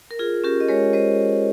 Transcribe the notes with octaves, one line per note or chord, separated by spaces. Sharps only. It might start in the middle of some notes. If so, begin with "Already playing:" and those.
A#4
F4 G#4
C#4 G4 A#4
D#5
G#3 A#4 C#5
G#3 C5 D#5